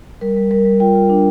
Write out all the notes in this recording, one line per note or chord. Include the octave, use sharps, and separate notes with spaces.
G3 A#4
G3
G3 A#4
G3
F4 G5
F4
D4